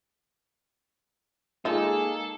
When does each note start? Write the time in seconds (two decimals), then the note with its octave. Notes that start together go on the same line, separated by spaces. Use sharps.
1.65 G#3 A#3 D#4 F4 G#4 A4